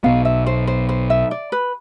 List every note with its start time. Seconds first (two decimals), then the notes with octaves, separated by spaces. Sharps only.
0.04 B1 B2 B3 F5
0.25 E5
0.46 C5
0.67 C5
0.89 C5
1.10 E5
1.31 D5
1.52 B4